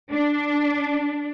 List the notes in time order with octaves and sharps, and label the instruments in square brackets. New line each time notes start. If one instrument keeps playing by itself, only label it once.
[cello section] D4